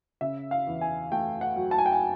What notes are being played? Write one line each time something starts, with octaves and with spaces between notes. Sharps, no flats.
C#3 E5
F5
E2
G#5
A3 G5
F#5
F#3
A5
G#5
G5
G#5